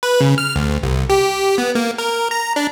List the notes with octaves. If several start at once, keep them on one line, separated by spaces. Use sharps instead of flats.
B4
C#3
F6
D2
C2
G4
B3
A#3
A#4
A#5
D4